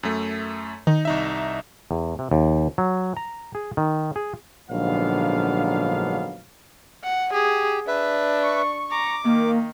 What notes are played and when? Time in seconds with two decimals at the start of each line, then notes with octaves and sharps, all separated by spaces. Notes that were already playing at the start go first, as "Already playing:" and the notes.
0.03 F#2 A3
0.87 D#3 D#4
1.05 C2 D#4 E5
1.91 E2
2.19 C3
2.31 D#2
2.78 F#3
3.17 A#5
3.55 G#4
3.77 D#3
4.16 G#4
4.70 A#1 G#2 D3 F#3 B3 F5
7.04 F#5
7.33 G4 G#4
7.87 D4 B4 E5
8.42 C#6
8.91 A#5 D6
9.25 D#3 A#3